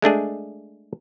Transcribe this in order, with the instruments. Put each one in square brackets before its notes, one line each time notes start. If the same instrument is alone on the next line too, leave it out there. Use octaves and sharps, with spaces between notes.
[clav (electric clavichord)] G#3 A3 D4 G#4